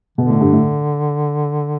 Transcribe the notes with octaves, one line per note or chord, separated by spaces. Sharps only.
B2 D3
A2
G2
A2